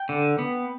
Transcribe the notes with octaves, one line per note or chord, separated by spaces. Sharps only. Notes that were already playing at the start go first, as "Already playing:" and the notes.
Already playing: G5
D3
B3